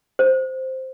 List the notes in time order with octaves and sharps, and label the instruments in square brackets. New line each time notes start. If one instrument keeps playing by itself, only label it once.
[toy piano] C5